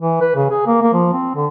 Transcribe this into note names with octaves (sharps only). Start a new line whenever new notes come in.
E3
B4
C#3
G#4
A#3
A#3
F3
C4
D3